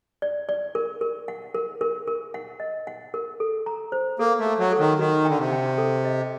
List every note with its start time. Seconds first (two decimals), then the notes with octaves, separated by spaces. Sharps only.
0.22 D5
0.49 D5
0.75 A#4
1.01 A#4
1.28 F#5
1.55 A#4
1.81 A#4
2.07 A#4
2.34 F#5
2.60 D#5
2.87 F#5
3.14 A#4
3.40 A4
3.66 A#5
3.92 C5
4.19 A#3 A4
4.40 A3
4.46 A4
4.59 F#3
4.73 A4
4.79 D#3
4.99 D#3 F#4
5.25 D3 G5
5.38 C3
5.52 G5
5.78 A4
6.05 D#5